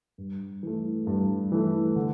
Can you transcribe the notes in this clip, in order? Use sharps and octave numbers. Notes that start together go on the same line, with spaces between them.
G2
E3 A3
G2
E3 A3
D3